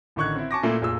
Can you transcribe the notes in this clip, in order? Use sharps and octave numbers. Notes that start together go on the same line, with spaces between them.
A1 D3 D#3 C#6 F#6 G#6
C4 E4
G#5 A5 C#6 D6 A#6
A#2 A3 A#3 E4 A4
F1 A#2 G#4 E6